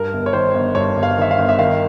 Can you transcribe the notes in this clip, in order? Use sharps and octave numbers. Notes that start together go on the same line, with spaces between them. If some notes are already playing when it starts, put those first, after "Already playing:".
Already playing: G2 A#4
G1
C#5
D#3 C5
G1
G2 C#5
G1
F5
D#3 E5
F5
G1
E5
D#3 F5